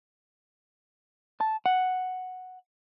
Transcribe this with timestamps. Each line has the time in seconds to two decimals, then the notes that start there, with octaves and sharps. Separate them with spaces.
1.41 A5
1.66 F#5